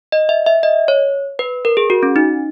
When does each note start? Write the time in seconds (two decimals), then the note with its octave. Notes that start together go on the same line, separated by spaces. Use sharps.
0.12 D#5
0.29 E5
0.46 E5
0.63 D#5
0.88 C#5
1.39 B4
1.65 A#4
1.77 G#4
1.90 F#4
2.03 C#4
2.16 D#4